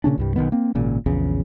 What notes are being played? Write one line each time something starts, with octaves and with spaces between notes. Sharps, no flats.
A#2 C#3 C#4 D4
C2 G2 G3
B1 E2 D#3 B3
A#3 C4
G#1 A#2 C#3
A#1 E2 C#3